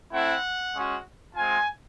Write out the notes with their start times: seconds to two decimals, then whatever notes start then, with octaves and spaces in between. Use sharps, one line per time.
0.12 A3 C4 E4 F#5
0.75 G#3 C#4 F#4
1.36 G#3 C4 F4 G#5